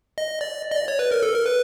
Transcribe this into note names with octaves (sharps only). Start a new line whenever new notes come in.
D#5
D5
D#5
D5
C#5
B4
A#4
A4
A#4
B4